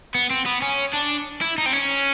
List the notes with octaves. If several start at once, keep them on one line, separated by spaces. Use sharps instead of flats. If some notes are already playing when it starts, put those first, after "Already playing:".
B3
C4
B3
C#4
D4
E4
D#4
C4
C#4